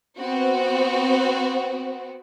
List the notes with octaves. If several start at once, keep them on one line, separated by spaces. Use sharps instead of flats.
B3 C4 F#4